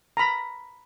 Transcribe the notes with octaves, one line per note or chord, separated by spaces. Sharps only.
A#5 B5